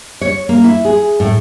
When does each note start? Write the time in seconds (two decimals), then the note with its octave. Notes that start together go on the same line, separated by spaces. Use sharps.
0.21 C#5
0.49 A#3
0.64 E4
0.85 G#4
1.20 A2